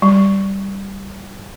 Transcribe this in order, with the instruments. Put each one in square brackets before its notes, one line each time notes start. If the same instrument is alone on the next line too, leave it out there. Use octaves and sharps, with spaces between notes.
[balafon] G3